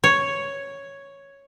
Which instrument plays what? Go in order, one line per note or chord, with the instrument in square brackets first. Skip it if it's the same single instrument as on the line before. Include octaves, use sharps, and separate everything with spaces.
[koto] C#5